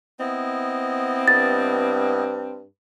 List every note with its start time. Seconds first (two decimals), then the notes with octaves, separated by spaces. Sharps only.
0.20 B3 C4 E4 D#5
1.28 G2 A6